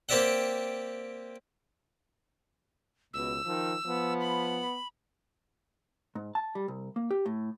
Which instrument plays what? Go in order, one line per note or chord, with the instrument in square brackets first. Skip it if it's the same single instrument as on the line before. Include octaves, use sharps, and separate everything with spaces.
[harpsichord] A#3 C4 G4 D5 E5 F#5
[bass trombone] C#2 [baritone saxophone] B2 [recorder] E6
[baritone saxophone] D#3 [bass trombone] F3
[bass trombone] F3 [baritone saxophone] B3
[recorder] B5
[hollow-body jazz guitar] G#2
A5
G3
C2
A#3
G4
A2